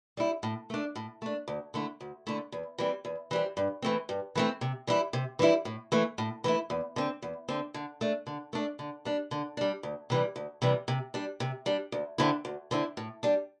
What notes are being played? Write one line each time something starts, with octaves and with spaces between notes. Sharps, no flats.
G3 E4
A2
A3 D4
A2
A3 D4
D2
D3 A3 E4
D2
D3 A3 E4
E2
E3 G3 C4
E2
E3 G3 C4
G2
E3 A3 C4
G2
E3 A3 C4
C3
E3 G3 E4
C3
E3 G3 E4
A2
E3 A3 E4
A2
E3 A3 E4
E2
D3 C4
E2
D3 C4
D3
A3 D4
D3
A3 D4
D3
G3 D4
D3
G3 D4
D2
C3 E3 G3
D2
C3 E3 G3
C3
G3 D4
C3
G3 D4
D2
D3 C4 E4
D2
D3 C4 E4
A2
G3 D4